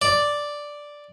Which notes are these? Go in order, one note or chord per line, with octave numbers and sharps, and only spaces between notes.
D5